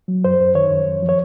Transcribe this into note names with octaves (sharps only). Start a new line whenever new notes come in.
F#3
F#2 C5
F#2
D#3 C#5
F#2
F#2
F3
C#5